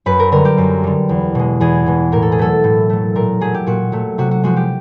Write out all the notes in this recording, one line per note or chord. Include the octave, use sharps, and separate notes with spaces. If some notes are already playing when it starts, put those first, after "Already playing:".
F#2 B4
A#4
D3 G3 A#4
G4
F#2
D3 G3
E2
B2 G#3
E2 G#4
B2 G#3
A2 A#4
A4
G#4
F#3 A3 A4
A2
F#3 A3
A#2 A#4
F#3 A3 G#4
G4
A#2 F#4
F#3 A3
C3 F#4
F#4
F3 G#3 F#4
G4